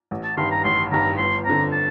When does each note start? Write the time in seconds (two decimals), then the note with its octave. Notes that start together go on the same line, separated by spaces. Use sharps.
0.11 A1
0.24 A5
0.37 G2 D#3 C6
0.51 A#5
0.64 A1 C6
0.92 G2 D#3 A#5
1.18 G1 C6
1.45 F2 D3 A#5
1.72 A5